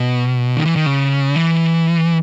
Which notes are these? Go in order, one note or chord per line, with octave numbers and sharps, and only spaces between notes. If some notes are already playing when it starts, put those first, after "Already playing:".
Already playing: B2
D#3
E3
D#3
C#3
E3